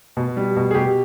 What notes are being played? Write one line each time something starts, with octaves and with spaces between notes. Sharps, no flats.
B2
G3
B2
G#4
B2 G4